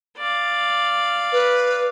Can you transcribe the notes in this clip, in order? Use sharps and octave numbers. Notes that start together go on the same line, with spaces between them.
D5 F5
B4